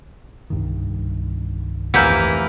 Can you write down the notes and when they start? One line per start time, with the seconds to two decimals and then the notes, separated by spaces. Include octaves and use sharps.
0.50 C2 G2 D#3
1.94 F1 E3 A#3 E4 F#5 A#5 F6 G6